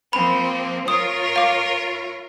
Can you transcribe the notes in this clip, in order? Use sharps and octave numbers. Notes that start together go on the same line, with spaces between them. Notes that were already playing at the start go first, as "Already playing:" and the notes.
F3 A#3 C4 B5
F4 A#4 C#5 D#6
F5 D6